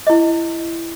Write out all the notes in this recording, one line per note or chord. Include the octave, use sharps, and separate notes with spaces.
E4 D#5